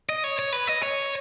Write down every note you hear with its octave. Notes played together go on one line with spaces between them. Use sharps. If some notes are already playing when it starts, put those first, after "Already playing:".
D#5
C#5
C#5
B4
D#5
C#5